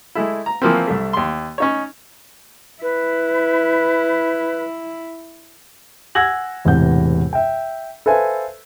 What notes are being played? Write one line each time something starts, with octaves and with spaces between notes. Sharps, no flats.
G#3 A3 E4
A#5
E3 F3 A#3 C4
C2 A3
D#2 C6
C#4 D#4 C#5
E4 B4
F#5 G#5 E6 G#6 A#6 F#7
E1 E2 A2 C3 F#5 G6
E5 G5
A4 B4 C5 E5 F5 G#5